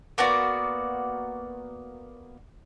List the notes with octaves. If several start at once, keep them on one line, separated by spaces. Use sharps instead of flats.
A#3 B3 F#4 D5